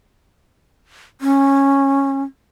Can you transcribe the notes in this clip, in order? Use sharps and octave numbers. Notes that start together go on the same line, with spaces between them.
C#4